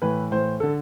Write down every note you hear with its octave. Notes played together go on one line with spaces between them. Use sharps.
A2 E3 B4
A2 E3 C5
D3 A4